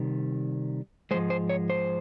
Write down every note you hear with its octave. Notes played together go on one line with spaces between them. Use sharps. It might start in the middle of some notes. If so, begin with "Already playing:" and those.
Already playing: C3 D#3 G3
G#2 F3 G#3 C5
C5
C#5
C5